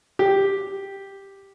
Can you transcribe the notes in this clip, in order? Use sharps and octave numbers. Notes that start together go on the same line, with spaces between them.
G4